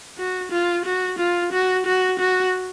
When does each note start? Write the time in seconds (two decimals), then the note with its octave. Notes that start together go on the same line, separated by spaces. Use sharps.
0.18 F#4
0.52 F4
0.86 F#4
1.19 F4
1.53 F#4
1.86 F#4
2.20 F#4